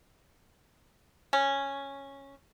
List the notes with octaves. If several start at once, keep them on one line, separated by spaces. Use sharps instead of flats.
C#4